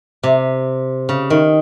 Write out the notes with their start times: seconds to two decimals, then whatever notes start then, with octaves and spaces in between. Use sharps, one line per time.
0.23 C3
1.09 C#3
1.30 D#3